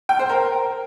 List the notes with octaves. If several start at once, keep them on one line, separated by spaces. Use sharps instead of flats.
G5
C5
A#4